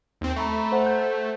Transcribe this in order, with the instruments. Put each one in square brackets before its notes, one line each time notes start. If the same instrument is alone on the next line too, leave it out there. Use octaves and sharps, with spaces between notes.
[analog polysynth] D#2 C4
[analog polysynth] A3 [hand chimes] A#5 B5 C#6
[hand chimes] C5 F#5
G6